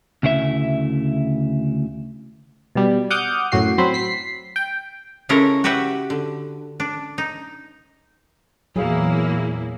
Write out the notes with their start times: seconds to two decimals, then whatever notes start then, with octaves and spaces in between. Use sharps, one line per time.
0.23 D2 C#3 E4 C5 E5
2.75 B2 G3
3.10 F#5 D6 D#6 F6 G6
3.52 F#2 A2 F#4 C7
3.78 F#3 C4 B5 C6
3.94 B6 C7
4.56 G5
5.29 C#3 G#3 C#4 E4 A4 A#4
5.64 F#4 G4 B4 E5 F#5
6.10 D3
6.80 D4
7.18 D#4
8.76 E2 A#2 F#3 A#3 E4 G#4 F5